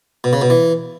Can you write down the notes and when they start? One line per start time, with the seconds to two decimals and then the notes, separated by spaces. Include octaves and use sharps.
0.24 B2
0.33 C#3
0.42 B2
0.50 E3